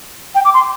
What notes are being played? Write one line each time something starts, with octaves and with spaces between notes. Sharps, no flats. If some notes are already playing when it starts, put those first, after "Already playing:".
G5
D6
C6